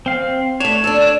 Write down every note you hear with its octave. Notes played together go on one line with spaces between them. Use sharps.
C4 F5
A3 D4 C#5 E7
D4 A4